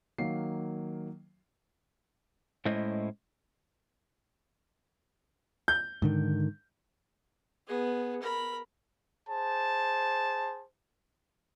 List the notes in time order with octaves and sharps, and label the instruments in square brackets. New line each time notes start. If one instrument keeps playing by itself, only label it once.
[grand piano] D#3 F#3 A#3 F5 C7
[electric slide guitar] A2 G#3 C#4 E4 C5 D#5
[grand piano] G6
[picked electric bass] G#2 D3 D#3
[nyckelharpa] B3 G#4
A#4 B5
[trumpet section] G#4 C5 A5